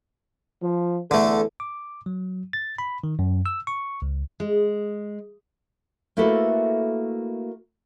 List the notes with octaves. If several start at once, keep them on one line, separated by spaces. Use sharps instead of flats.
F3
E2 D3 A3 A4
D6
F#3
A6
B5
D#3
F#2
E6
C#6
C#2
G#3
A3 A#3 E4 F#4 A4 B4